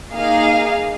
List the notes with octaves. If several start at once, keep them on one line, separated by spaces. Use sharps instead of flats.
A#3 D#4 G#4 F5